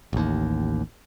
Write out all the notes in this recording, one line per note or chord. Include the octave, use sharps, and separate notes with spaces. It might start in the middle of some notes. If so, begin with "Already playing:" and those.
A1 D#2